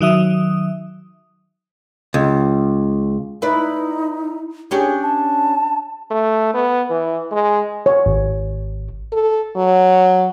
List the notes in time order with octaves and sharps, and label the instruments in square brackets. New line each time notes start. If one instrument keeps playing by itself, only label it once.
[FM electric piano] D#3 F#3 E5 D#6
[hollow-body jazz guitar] C#2
[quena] D#4 [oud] E4 B4 D5
[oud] C#4 D4 G4 [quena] G#4
[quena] A5
[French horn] A3
B3
E3
G#3
[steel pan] C#5
[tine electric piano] G#1
[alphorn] A4
F#3